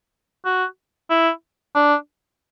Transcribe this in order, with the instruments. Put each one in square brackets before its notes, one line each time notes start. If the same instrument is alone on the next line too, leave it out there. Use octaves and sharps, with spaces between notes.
[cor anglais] F#4
E4
D4